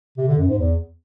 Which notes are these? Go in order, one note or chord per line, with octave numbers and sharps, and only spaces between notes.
C3
D3
F#2
G#2
E2